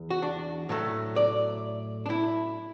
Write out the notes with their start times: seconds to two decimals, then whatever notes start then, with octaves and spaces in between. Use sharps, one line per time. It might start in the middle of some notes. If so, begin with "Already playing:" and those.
Already playing: E2 E3
0.10 F#4
0.22 D4
0.69 A2 F#3 A3
1.16 D5
2.06 D4
2.10 E4